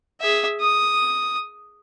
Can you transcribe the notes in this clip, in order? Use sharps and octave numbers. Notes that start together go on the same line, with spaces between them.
G#4 E5
D#6